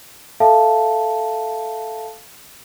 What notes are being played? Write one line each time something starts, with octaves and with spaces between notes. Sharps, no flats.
A4 E5 F5 A5